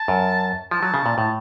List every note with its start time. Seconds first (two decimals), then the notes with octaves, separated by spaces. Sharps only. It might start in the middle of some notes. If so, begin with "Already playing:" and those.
Already playing: A5
0.08 F#2
0.71 F3 A5
0.83 F#3
0.94 C#3
1.06 A#2
1.17 A2 A5